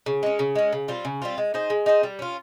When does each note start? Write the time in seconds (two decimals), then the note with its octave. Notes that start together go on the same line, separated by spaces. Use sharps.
0.06 C#3
0.23 G#3 C#4
0.39 C#3
0.56 G#3 C#4
0.73 C#3
0.88 G3 C4 F4
1.05 C#3
1.22 G3 C4 F4
1.38 G#3
1.54 D#4 G#4 C5
1.70 G#3
1.86 D#4 G#4 C5
2.03 G3
2.19 C#4 F4